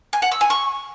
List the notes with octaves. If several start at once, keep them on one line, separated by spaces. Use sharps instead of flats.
G#5
F#5
E6
G#5
C#6